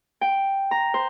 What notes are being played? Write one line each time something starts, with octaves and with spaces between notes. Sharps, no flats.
G5
A#5
C5